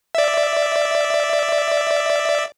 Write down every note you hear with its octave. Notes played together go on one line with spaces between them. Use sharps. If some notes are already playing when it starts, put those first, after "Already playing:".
D5 E5